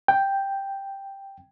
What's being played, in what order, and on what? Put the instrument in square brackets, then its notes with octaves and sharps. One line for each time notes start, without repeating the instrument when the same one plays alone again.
[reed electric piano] G5